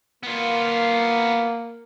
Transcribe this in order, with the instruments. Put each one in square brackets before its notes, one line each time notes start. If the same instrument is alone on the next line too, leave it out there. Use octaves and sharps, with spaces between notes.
[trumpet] A#3 [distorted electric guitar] B3 F4